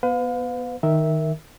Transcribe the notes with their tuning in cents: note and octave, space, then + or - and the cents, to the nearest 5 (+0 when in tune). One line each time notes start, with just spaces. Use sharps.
B3 -10 B4 +35 F5 +35
D#3 +0 A#4 +5 E5 -10